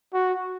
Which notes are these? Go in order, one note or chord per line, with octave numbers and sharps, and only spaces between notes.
F#4